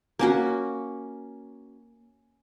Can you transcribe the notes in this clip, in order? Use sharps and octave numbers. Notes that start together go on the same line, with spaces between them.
A#3 C#4 F#4